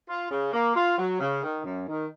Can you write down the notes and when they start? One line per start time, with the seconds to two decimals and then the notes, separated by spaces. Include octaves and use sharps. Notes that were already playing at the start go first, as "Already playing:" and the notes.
0.08 F4
0.31 C#3
0.53 A#3
0.75 F4
0.98 F#3
1.20 C#3
1.43 D#3
1.64 F#2
1.87 D#3